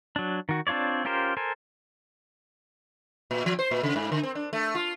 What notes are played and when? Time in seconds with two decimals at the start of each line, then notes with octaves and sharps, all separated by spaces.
0.16 F#3 D4
0.49 D#3 F#4
0.67 C4 D4 F4 C#5 D5
1.05 C#4 F4 G4 A#4 C5
1.37 A4 A#4 C5 G#5
3.31 A#2
3.46 F3
3.59 C5
3.71 A#2
3.83 C#3
3.96 G#2
4.12 D3
4.23 C4
4.35 D4
4.53 A3
4.75 F4